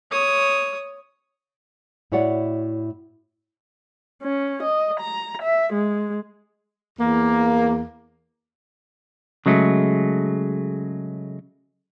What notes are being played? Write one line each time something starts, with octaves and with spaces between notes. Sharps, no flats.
C#5 D#6
A2 E4 F#4 C#5 D5 F#5
C#4
D#5
A#5
E5
G#3
E2 A#3
C#3 F#3 G#3 A3